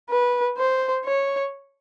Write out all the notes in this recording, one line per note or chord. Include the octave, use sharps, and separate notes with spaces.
B4
C5
C#5